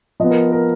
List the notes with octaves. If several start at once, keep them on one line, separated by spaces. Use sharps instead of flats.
F3 B3 D#5
A#4
A#4